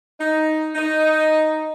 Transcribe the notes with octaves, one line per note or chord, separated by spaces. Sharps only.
D#4
D#4